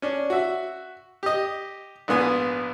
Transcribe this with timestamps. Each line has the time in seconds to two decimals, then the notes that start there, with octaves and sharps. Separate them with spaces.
0.02 C#4 D4
0.30 F#4 E5
1.23 G4 D#5
2.08 A#1 G#2 B3 G#5